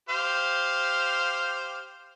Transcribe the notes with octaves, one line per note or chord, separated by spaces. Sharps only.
G4 C5 F5